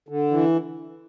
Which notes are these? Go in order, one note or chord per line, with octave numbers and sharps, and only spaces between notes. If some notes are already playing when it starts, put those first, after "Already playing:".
D3
E3